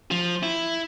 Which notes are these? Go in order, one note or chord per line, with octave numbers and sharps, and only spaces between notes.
F3
E4